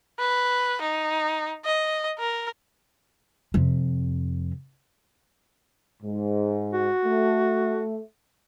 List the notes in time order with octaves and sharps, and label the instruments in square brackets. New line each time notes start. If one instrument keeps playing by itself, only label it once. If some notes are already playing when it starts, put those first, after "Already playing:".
[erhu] B4
D#4
D#5
A#4
[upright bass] F2 C3
[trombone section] G#2
[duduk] F#4
[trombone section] A3